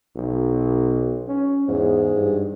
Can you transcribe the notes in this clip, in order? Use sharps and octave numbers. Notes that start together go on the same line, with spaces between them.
B1
C#4
E2 G#2
G2